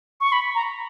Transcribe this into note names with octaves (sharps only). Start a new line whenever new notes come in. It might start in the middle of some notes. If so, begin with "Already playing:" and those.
C#6
B5
A#5